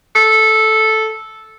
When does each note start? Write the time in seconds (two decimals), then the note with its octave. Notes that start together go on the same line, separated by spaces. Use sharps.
0.15 A4